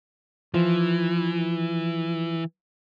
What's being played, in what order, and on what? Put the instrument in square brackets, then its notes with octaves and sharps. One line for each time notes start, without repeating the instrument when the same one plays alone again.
[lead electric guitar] E3 [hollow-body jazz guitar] F3